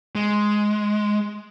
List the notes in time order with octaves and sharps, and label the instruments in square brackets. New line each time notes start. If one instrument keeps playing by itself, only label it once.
[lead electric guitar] G#3